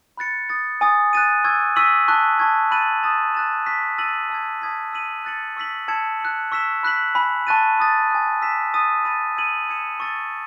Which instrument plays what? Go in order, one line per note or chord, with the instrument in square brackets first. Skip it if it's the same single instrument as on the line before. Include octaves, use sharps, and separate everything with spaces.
[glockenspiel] B5 F#6 A6 C#7
D#6 A6 C#7
G#5 D#6 A6
F#6 A6 D#7
C#6 E6 G#6
C#6 E6 B6 D#7 F#7
A5 C#6 F#6
A5 C#6 G#6
B5 F#6 A6 D#7 F#7
D#6 A6 E7
F#6 A6 E7
C#6 F#6 B6
E6 A6 D#7 F#7
A5 E6 G#6
A5 D#6 G#6 B6
E6 B6 D#7 F#7
F#6 A6 C#7 F#7
C#6 E6 B6 F#7
A5 E6 G#6 C#7 E7
F#6 C#7 F#7
C#6 E6 B6 E7
B5 F#6 B6 F#7
G#5 B5 F#6
A5 C#6 F#6 A6 D#7
B5 D#6 A6
G#5 D#6 F#6
E6 B6 E7
D#6 A6 D#7
B5 D#6 A6 D#7
E6 G#6 D#7 F#7
D#6 G#6 C#7 E7
C#6 E6 A6 C#7